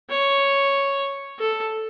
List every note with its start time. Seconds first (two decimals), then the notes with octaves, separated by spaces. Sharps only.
0.10 C#5
1.39 A4